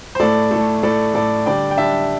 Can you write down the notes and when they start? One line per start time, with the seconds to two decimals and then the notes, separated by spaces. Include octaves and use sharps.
0.15 C5
0.20 A2 A3 A4 D5
0.51 A2 A3 A4
0.83 A2 A3 A4 D5
1.14 A2 A3 A4 D5
1.46 D3 G3 D5 G5
1.71 G5
1.78 D3 G3 E5 A5